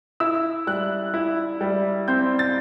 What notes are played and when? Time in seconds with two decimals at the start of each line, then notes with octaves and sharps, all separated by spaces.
0.20 E4 E6
0.67 G3 F#6
1.14 E4
1.61 G3
2.08 C4 G6
2.39 A6